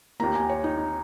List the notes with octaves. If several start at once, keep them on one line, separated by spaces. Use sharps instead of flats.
D#2 D#3 A#3 A#5
G#5
C#5
D#4
D#4